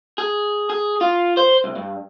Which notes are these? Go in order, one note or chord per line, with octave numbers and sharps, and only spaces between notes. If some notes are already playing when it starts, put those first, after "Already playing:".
G#4
G#4
F4
C5
C2
G2